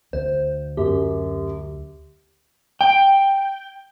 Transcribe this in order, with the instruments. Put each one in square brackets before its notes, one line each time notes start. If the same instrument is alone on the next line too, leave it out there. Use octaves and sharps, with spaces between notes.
[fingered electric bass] D2 [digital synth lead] C5
[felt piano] F#2 [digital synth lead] G4
[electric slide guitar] G5